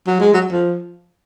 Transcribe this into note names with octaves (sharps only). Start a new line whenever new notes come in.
F#3
G#3
F#3
F3